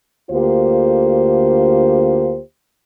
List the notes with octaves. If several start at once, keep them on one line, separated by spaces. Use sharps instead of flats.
D2 D3 A#3 F4 G4 C5